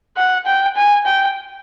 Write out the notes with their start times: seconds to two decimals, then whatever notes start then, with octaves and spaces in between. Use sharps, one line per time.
0.17 F#5
0.46 G5
0.76 G#5
1.06 G5